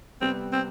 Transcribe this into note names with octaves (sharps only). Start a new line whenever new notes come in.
C3 G3 B3 C4
C4